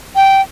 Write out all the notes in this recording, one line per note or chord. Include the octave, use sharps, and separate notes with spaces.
G5